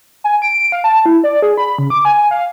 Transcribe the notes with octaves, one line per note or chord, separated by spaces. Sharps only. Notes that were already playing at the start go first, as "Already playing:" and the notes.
G#5
D7
F5
A5
E4
D5
G#4
B5
C#3
D6
G#5
F5